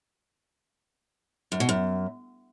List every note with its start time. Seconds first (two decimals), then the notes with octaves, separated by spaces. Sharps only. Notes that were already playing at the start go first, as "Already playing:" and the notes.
1.52 F#2
1.60 B2
1.69 F#2